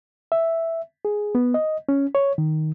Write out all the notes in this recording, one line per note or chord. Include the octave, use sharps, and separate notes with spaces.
E5
G#4
B3
D#5
C#4
C#5
D#3